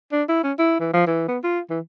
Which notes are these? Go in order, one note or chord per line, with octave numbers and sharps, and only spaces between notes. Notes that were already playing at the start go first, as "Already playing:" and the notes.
D4
E4
C#4
E4
E3
F3
E3
B3
F4
E3